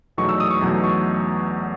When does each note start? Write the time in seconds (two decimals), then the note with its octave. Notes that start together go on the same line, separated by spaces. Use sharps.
0.18 E2 B2 F#3 A3 D#4 C#6
0.29 E6
0.40 D#6
0.51 C#6
0.61 E2 B2 F#3 A3 D#4
0.84 C#6